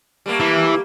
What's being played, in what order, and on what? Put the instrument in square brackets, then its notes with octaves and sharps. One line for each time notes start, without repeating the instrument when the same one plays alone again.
[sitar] G3 A3 A#3
[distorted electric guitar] E3